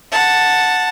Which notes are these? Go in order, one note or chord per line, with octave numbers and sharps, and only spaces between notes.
F#5 A5